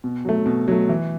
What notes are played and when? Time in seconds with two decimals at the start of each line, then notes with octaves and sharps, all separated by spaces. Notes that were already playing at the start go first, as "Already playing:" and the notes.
0.04 B2
0.25 F#3 A3
0.46 B2
0.68 F#3 A3
0.89 E3